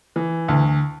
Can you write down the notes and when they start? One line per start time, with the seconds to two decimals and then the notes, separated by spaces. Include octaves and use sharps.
0.16 E3
0.48 D2